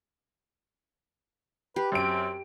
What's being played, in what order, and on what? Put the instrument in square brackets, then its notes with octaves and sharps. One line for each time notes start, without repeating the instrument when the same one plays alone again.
[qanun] G4 [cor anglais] B4
[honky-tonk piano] F#2 D7 [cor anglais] C4